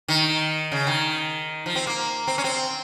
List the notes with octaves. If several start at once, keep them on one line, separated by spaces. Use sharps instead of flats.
D#3
C#3
D#3
F3
C4
A#3
C4
C#4
C4